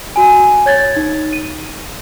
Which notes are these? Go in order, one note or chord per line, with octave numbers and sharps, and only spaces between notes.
F#4 G#5
C#5 G#6 A6
D#4
D#7